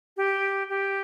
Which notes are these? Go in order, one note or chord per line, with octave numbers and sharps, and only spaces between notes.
G4
G4